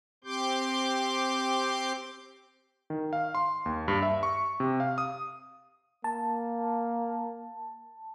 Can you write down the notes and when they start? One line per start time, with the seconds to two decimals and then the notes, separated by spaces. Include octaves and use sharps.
0.24 C4 G4 C6 D6 G6
2.90 D#3
3.13 F5
3.35 C6
3.66 D#2
3.88 G2
4.02 E5
4.23 C#6
4.60 C3
4.80 F5
4.98 D#6
6.04 A#3 A5